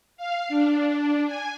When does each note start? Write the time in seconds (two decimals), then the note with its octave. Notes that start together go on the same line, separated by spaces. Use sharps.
0.17 F5
0.49 D4
1.26 G#5